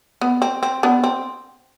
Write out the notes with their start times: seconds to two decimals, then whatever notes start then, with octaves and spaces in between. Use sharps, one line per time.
0.21 B3
0.42 C4
0.63 C4
0.83 B3 D4
1.04 C4